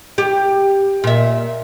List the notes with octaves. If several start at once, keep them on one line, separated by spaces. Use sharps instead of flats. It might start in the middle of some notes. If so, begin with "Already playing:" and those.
G4
A#2 E5